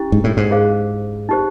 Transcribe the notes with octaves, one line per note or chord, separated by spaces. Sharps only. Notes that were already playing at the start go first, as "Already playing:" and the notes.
Already playing: C#4 E4 G4
G#2
A2
G#2
G#4 C5 F5
D#4 G4 C5